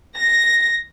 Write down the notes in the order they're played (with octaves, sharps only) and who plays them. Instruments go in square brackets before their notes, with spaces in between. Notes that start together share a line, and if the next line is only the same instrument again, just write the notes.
[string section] A#6